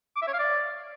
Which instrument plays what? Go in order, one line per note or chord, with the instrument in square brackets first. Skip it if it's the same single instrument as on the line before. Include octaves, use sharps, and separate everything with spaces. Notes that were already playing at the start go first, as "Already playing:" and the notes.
[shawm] D6
E5
C#5
F5
D5